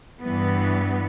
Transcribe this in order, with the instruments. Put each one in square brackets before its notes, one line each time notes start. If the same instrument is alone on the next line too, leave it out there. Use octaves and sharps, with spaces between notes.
[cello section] G2 E3 B3